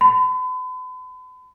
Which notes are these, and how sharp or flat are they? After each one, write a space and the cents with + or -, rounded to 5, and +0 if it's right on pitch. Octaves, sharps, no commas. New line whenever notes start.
B5 +40